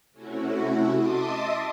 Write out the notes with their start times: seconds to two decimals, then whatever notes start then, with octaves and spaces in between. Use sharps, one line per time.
0.11 C3 A3 C#4 E4 F#4
0.92 D#5 E5 A5 C6 D6 D#6